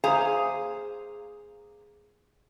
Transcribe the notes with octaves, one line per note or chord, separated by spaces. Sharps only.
A#3 G#4 C5 F5 G#5 A#5